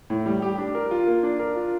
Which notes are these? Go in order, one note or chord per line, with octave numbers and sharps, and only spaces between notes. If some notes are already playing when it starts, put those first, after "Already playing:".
A2
G3
G4
D4
A#4
F4
A#3
D4
A#4
F4